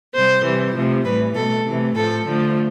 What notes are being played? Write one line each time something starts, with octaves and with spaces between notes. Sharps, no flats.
C3 G3 C5
C3 E3 G3
C3 F3 A3
A2 E3 G3 B4
B2 A3 A4
C3 E3 A3
A2 F3 A3 A4
D3 F3 A3